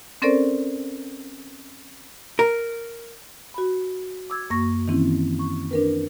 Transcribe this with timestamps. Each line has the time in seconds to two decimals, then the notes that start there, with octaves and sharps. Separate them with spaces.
0.22 C4 C#4 A4 A#4 C5 D5
2.39 A#4
3.54 F#4 B5
4.30 D6 E6 G#6
4.50 F#2 A#3 C#6 A#6
4.88 D#3 E3 C4 C#4 E4
5.39 C#6
5.71 D4 A#4 B4